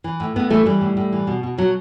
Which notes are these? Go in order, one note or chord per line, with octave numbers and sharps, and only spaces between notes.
E3
A2
A2 B3
E3 A3
E3 G3
A2
A2
E3
B2
B2
B2 F#3